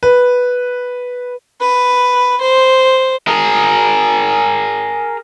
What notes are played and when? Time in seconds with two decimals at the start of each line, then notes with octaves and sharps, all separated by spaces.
0.03 B4
1.61 B4
2.41 C5
3.28 G#4 A#4